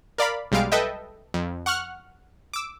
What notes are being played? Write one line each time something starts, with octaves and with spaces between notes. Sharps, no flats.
A#4 D5 F5 B5
B1 G3 G#3 F5 D7
A4 B4 D#5 E5 G5
F2
F#5 C#6 F6 F#6
D6 E6